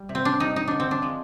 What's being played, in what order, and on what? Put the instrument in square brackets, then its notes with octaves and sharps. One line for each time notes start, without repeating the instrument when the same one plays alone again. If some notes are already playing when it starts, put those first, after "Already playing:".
Already playing: [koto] G3
C3
C4
D4
G3 D#4
D#4
D3 D4
C4
D4
F3 G#3